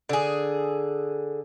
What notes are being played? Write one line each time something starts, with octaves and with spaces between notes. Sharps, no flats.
D3 G#4